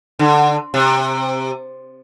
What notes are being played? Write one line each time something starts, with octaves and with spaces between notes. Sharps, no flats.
D3
C3